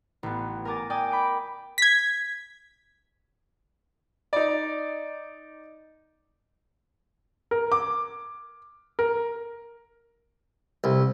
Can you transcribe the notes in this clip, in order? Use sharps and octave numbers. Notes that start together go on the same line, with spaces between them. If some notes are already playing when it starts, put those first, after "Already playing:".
A1 B3
A#4 G#5 A#5 D6 A6
D5 G5 G#5 D6 D#6
B5 D6 G6 D7
G#6 B6
D#4 D5
A#4
D6
A#4
C2